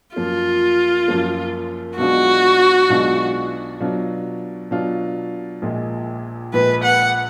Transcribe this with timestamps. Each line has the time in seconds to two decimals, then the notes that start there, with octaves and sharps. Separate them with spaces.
0.16 F#2 F3 A#3 F4
1.08 F#2 F3 A#3
1.98 B1 B2 G#3 D4 F4 F#4
2.89 B1 B2 G#3 D4 F4
3.80 B2 F#3 D4 F4
4.71 B2 F#3 D4 F4
5.62 A#1 A#2 G#3
6.53 A#1 A#2 G#3 B4
6.84 F#5